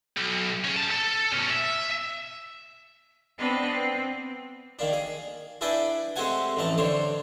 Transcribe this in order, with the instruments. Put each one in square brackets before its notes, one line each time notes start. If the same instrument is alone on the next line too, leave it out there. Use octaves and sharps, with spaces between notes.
[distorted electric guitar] B1
C#4 G#4
G3 A5
A4
B2 C#4
E5
[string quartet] B3 C4 D4 B4 D#5
C4
[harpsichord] D#3 A#3 D4
G#4
D4 E4 G#4 B4 D5 G5
G#3 A3 C4 G4 F#5 G#5
A1 F2 E3 A3 D#4 A5
D3 D4 C5 C#5